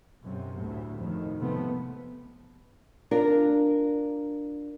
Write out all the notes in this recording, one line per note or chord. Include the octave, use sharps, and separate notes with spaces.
B1 F#2 C3
D2 A2
F2 A2 D#3
C3 F3 A3 B3
D4 F4 A#4